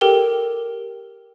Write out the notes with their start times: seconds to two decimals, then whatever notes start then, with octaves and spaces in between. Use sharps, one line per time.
0.01 G4 A4 A#4 G5 G7